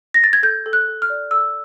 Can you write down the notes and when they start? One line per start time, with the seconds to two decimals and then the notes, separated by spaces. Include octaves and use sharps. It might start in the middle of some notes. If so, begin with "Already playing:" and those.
0.14 A#6
0.24 A6
0.33 G#6
0.43 A4 G6
0.66 A4
0.73 F#6
0.88 A4
1.02 F6
1.10 D5
1.31 A4 E6